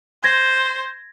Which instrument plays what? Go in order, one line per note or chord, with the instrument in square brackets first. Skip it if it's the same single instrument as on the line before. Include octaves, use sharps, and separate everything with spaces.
[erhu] C5 [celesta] G#6 A#6